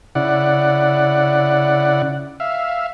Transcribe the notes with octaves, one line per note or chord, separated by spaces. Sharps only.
C#3 E4 D5 F#5
E5 F5